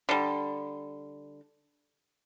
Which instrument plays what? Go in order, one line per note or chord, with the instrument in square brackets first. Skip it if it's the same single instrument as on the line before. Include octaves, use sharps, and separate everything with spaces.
[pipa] D3 G3